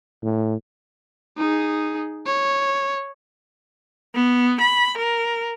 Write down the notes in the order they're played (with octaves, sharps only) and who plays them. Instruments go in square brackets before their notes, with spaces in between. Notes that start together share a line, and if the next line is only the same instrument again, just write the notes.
[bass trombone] A2
[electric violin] D#4 G#4
C#5
[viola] B3
B5
A#4